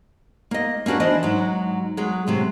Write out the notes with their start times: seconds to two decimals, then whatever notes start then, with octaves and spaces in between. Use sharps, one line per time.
0.51 A#3 D#5
0.86 A#3 C#4 D4 F#4 B4
1.00 E3 D4 C5 D#5
1.23 G#2 F#3
1.97 F#3 G#3
2.27 A2 C3 F#3